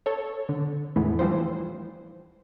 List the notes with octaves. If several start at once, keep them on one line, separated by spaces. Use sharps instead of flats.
A4 C#5
D3
E2 A2 E3 G#3 A3 B3
E3 F3 G3 C5